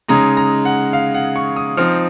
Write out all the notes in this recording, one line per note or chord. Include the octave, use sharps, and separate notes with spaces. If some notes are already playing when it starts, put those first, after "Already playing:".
C#3 G#3 D#4 A#5
A#5
F#5
F5
F#5
C#6
D#6
F3 C4 D#4 F6